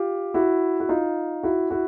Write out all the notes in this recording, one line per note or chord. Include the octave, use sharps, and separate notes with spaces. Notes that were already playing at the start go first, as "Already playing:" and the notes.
Already playing: F4 G4
E4 F#4
F#4
D#4 F4
E4 F#4
E4 F#4